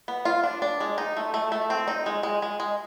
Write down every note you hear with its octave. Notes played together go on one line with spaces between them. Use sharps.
B3
F4
D4
D4
G#3
D#4
A3
A3
A3
C4
D#4
G#3
G#3
G#3
G#3